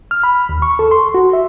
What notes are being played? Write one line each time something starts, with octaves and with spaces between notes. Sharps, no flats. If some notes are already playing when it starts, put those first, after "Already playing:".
F6
B5
D#2
C#6
A4
C6
F#4
E5